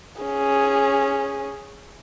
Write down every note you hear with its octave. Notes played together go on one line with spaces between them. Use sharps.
C#4 G#4